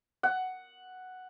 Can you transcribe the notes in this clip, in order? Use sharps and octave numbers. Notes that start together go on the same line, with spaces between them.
F#5